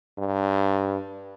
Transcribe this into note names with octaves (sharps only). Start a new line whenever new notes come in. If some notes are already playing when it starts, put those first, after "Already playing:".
G2